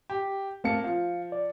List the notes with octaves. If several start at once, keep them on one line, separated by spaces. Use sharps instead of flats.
G4
A3 A#3 C4 F5 A5 C#7
F3 F5
D5